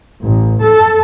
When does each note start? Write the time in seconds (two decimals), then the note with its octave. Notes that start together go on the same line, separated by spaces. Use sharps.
0.22 A1
0.62 A4